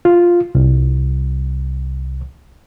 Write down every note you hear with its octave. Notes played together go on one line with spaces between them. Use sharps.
F4
C2